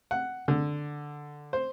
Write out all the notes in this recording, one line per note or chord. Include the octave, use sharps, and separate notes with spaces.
F#5
D3
C5